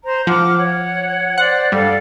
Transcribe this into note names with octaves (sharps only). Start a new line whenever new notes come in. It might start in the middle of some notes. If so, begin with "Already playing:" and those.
C5 A#5 C6
F3 F#5 D6 F6
C#5 F#5
C5 D5 F#5
G2 A4 D5 F5